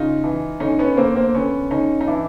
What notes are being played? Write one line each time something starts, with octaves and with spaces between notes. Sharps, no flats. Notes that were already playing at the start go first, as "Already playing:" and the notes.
Already playing: C#3 D#4 F4
E3
D3 C#4 D#4
B3 C#4
D3 A#3 C4
A#3 C4
D3 B3 C#4
D3 C#4 D#4
D#4
E3 D4 E4